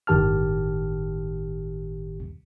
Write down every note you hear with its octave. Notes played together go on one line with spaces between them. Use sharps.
G1 A2 D#3 G4 A5 F6